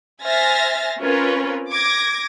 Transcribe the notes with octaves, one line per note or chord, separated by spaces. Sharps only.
C5 E5 G#5 F6 A6 A#6
C4 C#4 F4 A#4 B4
D6 G#6 A#6